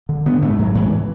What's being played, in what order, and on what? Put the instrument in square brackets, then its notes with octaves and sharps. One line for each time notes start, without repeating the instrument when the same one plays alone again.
[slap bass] D3
D3 B3
G#2 A3
G#2 F#3
G#2 E3